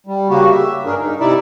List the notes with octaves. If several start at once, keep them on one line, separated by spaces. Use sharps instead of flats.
G3
C#3 A#3 F#4 G4
E5
G2 D4 G#4 A#4
D#4
C3 D#4 E4 D5 E5